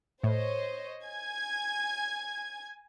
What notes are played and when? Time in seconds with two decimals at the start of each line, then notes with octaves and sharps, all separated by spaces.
0.24 A2 C5 C#5 D#5
1.04 G#5 G#6